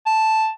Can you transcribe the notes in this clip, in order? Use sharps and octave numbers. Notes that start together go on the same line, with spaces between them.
A5